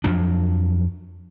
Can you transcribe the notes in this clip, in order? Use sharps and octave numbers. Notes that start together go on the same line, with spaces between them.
F2 F3 F#3 D4